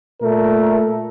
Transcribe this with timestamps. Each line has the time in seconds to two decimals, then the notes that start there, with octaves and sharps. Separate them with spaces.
0.22 A#2 A3 A#4